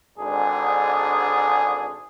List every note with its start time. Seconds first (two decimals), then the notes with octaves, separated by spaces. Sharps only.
0.17 G#1 G#2 D3 D4 G#4